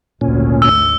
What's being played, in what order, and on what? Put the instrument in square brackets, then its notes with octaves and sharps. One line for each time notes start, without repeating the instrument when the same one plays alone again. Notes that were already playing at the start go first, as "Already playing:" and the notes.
[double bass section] G#1 D2 [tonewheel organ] A#2 C#4
[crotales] E6